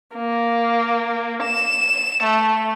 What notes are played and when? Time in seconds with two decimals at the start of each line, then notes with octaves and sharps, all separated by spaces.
0.15 A#3
1.42 E7
2.23 A3